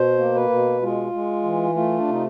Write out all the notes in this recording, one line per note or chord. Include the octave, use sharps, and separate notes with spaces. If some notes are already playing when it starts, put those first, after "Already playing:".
Already playing: B2 C5
A#3
B4
B2
G#3 F4
G#3
E3
A3 F4
D4
C3 D#4